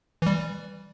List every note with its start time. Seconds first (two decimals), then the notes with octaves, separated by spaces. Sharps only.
0.22 E3 G3